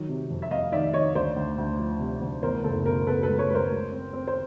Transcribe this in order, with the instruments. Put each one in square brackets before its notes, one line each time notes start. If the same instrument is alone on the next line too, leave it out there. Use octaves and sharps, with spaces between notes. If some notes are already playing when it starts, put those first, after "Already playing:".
Already playing: [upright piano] D#3 F#3
C3
F2
E5
F2 D#5 F5
D#3 D5 E5
D#3 C#5 D#5
D2 C5 D5
D2
D2
F3
C3
D2
E2 A#4 C5
F#1 A4
B2 A#4
B2 A4 B4
A4 B4
G#3
B4 C#5
G#3 B4
A#4 C5
G#3
C4
C4
C5